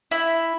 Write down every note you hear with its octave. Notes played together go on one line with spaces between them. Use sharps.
E4